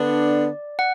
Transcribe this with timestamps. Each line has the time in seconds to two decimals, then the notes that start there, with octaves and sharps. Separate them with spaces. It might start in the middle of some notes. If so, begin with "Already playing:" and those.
Already playing: D3 B3 D4 D5
0.79 F#5